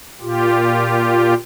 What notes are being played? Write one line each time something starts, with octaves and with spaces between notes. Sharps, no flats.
A#2 F4 G4